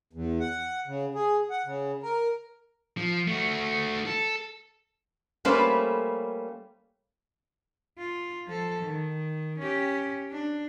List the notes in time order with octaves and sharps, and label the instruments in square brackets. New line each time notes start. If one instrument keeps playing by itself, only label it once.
[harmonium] E2
F#5
C#3
G#4
F#5
C#3
A#4
[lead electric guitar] F3
A3 F#4
A4
[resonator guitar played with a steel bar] G3 A3 A#3 C#4 B4 C5
[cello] F4
F3 A4
D#3
C#4 G4
D4